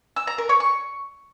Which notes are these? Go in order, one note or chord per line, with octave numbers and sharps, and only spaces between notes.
E6
A#5
A#4
C#5
C#6